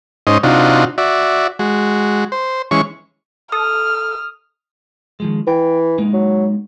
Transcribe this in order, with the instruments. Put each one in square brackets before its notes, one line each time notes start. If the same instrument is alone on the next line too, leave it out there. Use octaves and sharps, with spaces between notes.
[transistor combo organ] G#2 C#4 D#4 C5 D#5
C3 D4 D#4 F4 F#4
F#4 D5 E5
G#3 F#4
C5
E3 G#3 C#4 C#6
[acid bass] A4 [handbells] D#6 [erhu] F6
[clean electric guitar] D#3 F3 G#3
[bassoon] E3 [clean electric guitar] G5
[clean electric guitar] G#3 A#3 D#4
[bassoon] F#3